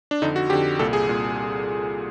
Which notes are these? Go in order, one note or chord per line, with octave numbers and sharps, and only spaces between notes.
D4
F2 D3 D#4
F#4
F2 D3 G4
C2 A#2 A4
G#4
C2 A#2